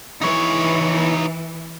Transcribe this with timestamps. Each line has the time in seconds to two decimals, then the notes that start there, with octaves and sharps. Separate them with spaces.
0.22 E3 D#4 C#5